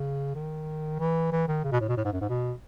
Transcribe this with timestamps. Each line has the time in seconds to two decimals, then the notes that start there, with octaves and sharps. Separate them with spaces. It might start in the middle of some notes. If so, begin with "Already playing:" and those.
Already playing: C#3
0.35 D#3
1.00 E3
1.32 E3
1.48 D#3
1.64 C#3
1.72 B2
1.81 A2
1.88 B2
1.97 A2
2.05 G#2
2.13 F#2
2.21 G#2
2.29 B2